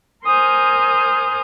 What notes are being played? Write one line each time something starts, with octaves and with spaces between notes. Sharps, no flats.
A#4 C5 G#5 D#6 F6 G6